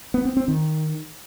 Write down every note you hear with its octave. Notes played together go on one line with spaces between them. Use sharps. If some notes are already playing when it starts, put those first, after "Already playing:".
B3
C4
C4
D#3